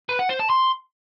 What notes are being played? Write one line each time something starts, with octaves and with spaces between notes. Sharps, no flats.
B4
F#5
C5
A5
C6